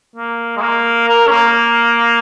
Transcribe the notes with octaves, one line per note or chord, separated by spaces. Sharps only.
A#3
G#3
A#3
A#4
C#4
A#3